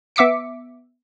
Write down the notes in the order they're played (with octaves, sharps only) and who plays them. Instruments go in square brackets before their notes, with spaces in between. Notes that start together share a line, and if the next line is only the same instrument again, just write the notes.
[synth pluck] B3 E5 D6 B6 C#7